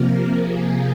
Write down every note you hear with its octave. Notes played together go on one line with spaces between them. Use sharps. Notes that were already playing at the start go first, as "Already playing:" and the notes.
Already playing: C3 F3 A#3 A#4
G#4